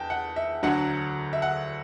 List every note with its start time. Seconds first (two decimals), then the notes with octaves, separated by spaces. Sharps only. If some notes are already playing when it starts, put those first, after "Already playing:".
Already playing: E2 G5 A5
0.10 F#5
0.36 E5
0.63 D2 D3 F#3 F#5
1.33 E5
1.42 F#5